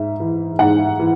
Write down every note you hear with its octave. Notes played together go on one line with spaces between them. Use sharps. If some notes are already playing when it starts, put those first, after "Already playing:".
Already playing: G#2 E5
E3
G#2 F#5
E3